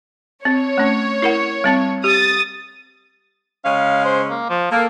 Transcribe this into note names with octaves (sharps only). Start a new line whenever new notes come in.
C4 C#5
A3 C#4
E4 A#4 F#5
G3 C4 A5
G4 D#6 A6
C#3 G#3 C#4 F5
C5
A#3
F3
A#3 A4